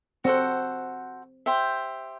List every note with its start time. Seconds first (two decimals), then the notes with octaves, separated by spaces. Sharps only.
0.24 C4 F#4 A4 C5 F#5
1.46 G4 C5 E5